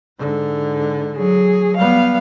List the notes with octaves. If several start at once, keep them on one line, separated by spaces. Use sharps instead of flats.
G#2 D3
F#3 G#4
G3 B3 F5